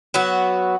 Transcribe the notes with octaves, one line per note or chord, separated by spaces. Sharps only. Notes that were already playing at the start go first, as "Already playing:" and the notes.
F#3 B3 F#4